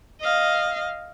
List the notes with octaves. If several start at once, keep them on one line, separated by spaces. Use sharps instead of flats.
D#5 F5